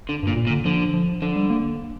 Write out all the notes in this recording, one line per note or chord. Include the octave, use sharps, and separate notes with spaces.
D3
G2 A#2
A#2
A#2
D3
D3 F3
F3
D3 F3
G3
A#3